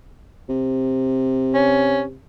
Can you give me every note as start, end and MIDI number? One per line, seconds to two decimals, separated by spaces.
0.49 2.16 48
1.54 2.03 61